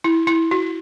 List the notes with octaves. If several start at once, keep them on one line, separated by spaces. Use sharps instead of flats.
E4
E4
F#4